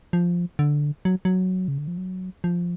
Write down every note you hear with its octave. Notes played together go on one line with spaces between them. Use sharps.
F3
D3
F#3
F#3
C#3
D3
F3
F#3
F3